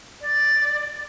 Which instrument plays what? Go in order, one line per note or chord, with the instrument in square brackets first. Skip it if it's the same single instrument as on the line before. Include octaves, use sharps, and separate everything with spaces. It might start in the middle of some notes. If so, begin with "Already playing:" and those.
[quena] D5